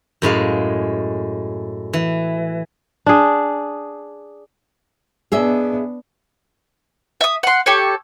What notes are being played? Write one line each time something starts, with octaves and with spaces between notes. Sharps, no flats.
F#2 A2 G#3 F5
E3
D4 G#4
B3 D4 G#4 D#5 E5
E5 D#6
F#5 C6
G4 A4 C#5